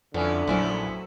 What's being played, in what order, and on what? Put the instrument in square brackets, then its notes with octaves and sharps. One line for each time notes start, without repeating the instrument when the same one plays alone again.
[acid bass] F2 [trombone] D3 [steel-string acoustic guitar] F3 [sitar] B3 C#4 E4
[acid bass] A#1 [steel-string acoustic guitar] F#3 A3 C5 [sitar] B3 C#4 E4